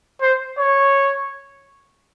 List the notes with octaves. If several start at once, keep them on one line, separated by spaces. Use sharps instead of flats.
C5
C#5